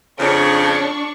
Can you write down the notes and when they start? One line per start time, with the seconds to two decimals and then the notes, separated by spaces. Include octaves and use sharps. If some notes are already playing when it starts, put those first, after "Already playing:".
0.19 F2 C#3 D4 C#6